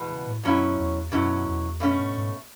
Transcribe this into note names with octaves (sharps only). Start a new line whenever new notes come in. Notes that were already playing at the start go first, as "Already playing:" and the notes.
Already playing: E2 B2 G#3 B3
C#3
A2
G#2
F#2 B2 F#3 C#4 E4
E2
F#2 B2 F#3 C#4 E4
E2
F#2 B2 A3 C#4
G#2
G#2